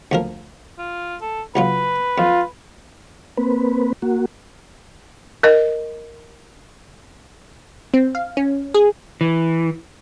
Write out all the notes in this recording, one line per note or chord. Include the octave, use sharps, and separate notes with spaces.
D2 F3 A#4
F4
A4
C#2 F#3 F4 B4
F2 F4
A#3 C4 B4
A#3 F#4
A#4 D#5
C4
F5
C#4
G#4
E3